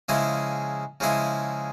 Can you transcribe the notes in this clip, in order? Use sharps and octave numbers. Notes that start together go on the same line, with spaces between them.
C#3 F3 G#3 E4 G#4
C#3 F3 G#3 E4 G#4